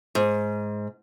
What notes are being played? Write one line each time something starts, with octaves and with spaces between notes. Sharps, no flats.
G#2